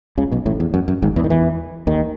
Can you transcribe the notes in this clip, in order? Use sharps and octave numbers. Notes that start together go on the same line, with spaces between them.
C#2 C#3
B1 B2
A1 A2
E2
F#2
F#2
G#1 G#2
E2 E3
D#3
E2 E3
D#2 D#3